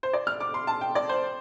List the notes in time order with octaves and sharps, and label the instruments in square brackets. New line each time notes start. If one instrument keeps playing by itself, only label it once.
[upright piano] C5
D5
F6
D6
C6
A5
G5
D5
C5